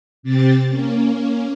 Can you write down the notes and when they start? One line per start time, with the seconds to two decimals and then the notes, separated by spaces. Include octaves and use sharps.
0.23 C3 C4 G4 A6
0.67 A#3 C#4